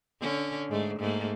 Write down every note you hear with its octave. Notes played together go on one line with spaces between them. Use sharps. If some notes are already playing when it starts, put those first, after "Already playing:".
D3 C#4
G#2 G#3 A3
G#2 A3 A#3